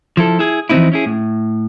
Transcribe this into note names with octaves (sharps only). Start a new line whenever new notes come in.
F3 E4 A4
E4 G#4
E3 F3 G#3 C4 D#4 E4
C#4 E4 G#4
A2